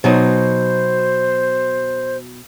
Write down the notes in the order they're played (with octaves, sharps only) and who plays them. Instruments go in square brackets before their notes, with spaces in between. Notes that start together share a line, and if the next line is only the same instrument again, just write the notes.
[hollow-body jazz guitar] B2 F#3 D#4 [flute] C5